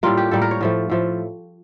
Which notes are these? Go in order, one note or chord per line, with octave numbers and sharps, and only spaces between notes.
A2 G3 A#3 F4
G4
A2 G3 A#3 A4
A#4
C#5
A2 F3 A3
A2 F3 A3